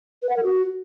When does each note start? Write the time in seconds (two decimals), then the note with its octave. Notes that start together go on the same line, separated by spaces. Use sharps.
0.22 B4
0.29 F#5
0.36 A#4
0.43 F#4